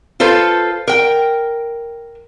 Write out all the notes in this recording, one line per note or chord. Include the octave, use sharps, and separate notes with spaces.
F4 A4 B4 C5
A#4 G5